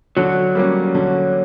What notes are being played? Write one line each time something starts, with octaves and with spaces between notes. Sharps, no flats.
D3 F#3
G3 A#3 C#4
D3